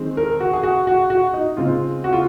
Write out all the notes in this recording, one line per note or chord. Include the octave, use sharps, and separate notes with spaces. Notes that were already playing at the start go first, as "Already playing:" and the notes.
Already playing: D#3 G#3 C4
A#4
F#4
G#4
F#4
F#4
F#4
D#4
C#3 G#3 C4 F4
F#4
F4